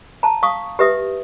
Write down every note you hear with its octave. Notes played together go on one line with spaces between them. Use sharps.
A5 A#5
F5 C#6 D#6
G4 B4 E5 D#6